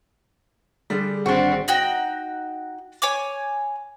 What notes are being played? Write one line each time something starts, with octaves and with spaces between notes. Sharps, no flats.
D3 G3 G#4 D5 G5
G#1 C4 D4 F#4
D#4 F#4 G5
C#5 G#5 D6